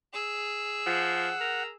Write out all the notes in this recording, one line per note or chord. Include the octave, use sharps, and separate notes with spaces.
G#4 E6
F3 F#5
A#4